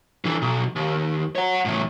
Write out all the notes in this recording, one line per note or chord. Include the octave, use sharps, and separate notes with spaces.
D3 E3
B1
D#2
C#5 F#5
E2 A2